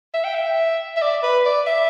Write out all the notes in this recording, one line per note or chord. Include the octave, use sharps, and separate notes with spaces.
E5
G5
E5
E5
D5
B4
D5
E5